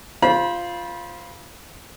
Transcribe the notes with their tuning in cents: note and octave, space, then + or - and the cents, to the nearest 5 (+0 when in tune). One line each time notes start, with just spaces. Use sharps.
F4 -5 C5 +0 B5 -30